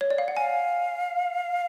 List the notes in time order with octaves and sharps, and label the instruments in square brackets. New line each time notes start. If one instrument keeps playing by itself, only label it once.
[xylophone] C#5
D5
F5
F#5
[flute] F5 [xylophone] G#5